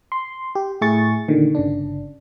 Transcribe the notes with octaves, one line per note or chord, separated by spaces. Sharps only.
C6
G4
A2 E4 G#4 C#6 A6
A#2 D3 D#3
G1 C#3 D4